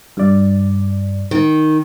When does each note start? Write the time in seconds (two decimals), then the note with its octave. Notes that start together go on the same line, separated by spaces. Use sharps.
0.17 G2 D5
1.31 D#3